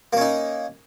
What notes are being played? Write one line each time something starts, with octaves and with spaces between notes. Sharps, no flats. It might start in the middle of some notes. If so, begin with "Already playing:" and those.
A#3 C#4 D#4